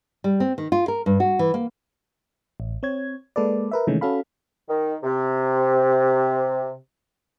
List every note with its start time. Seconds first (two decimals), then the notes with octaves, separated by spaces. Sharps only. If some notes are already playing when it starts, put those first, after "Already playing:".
0.24 G3
0.40 C4
0.58 D#3
0.72 F4
0.88 A#4
1.06 G2
1.20 F#4
1.39 E3
1.54 A#3
2.60 A1
2.83 C4 C#5 G#6
3.36 G#3 A#3 A4 B4 D5
3.71 A#4 B4 E5
3.87 C3 D#3 E3 G#3 A3 C#4
4.01 C#4 F#4 A4 F5 B5
4.69 D#3
5.03 C3